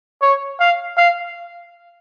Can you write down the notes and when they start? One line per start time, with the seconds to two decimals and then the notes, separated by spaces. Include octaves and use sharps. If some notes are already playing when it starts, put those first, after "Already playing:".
0.22 C#5
0.60 F5
0.97 F5